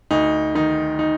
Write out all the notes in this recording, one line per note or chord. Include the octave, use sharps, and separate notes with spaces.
D2 D#4
D#3 D#4
D#4